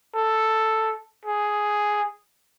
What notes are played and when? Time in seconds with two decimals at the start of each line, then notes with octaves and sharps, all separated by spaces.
0.15 A4
1.25 G#4